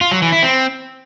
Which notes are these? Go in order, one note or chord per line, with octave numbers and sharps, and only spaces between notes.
F4
F#3
E3
E4
C4